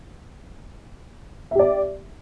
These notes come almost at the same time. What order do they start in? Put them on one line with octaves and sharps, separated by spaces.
E5 G4 D5